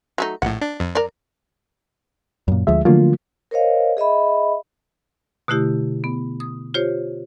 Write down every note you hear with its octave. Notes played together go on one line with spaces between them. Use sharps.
F#3 A3 D#4
A#1 A2 F#5
D4
F2
A#4 D5
F#2 A#2
D2 F3 G#3 E5
D3 F3 F#3 A3 A#3 F4
A#4 C5 C#5 D#5 F5
G#4 D#5 E5 B5
B2 D3 A3 E4 G4
B3
D#6
F4 G4 C5 C#5